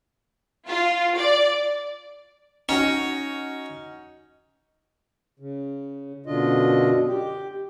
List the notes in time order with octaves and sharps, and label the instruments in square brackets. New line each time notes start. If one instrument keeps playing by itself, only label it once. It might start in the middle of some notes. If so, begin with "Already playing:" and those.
[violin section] F4
D5
[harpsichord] C#4 [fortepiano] D#4 F#4
[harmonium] C#3
F#2 B2 D3 D4 F4 D#5
G4